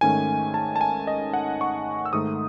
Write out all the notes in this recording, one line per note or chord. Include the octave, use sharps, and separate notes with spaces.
G#2 D#3 A3 C#4 G#5
A5
A5
G#5
D#5
F#5
C#6
E6
G#2 D#3 A3 D#4 D#6